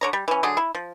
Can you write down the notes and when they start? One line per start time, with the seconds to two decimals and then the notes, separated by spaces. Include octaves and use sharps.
0.01 D3 C#5 A#5
0.13 G3
0.28 E3 C#4
0.43 D3 F#3 G#4
0.57 E4
0.75 F3